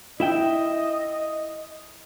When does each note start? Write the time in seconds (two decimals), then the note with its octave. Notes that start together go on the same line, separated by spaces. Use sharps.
0.20 E4 D#5 E5 G5